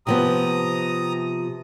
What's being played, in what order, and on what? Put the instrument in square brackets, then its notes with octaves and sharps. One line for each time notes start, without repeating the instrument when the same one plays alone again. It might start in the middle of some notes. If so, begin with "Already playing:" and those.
[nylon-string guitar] C3 F3 B3 [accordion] A#5 D#6